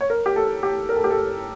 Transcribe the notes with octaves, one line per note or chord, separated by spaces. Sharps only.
C#5
A#4
G4
A4
G4
A#4
A4
G4
A4